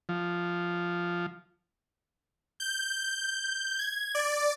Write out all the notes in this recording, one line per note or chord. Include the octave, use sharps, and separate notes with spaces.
F3
G6
G#6
D5